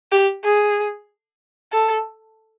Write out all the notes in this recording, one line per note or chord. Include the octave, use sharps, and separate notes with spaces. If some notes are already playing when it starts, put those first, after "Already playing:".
G4
G#4
A4